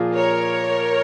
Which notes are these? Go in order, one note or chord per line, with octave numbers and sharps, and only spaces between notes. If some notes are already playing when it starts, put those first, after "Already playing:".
Already playing: A#2 F3 A#3 F4 G#4
A#4 C#5